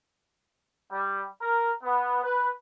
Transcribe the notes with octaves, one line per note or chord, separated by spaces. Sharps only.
G3
A#4
B3
B4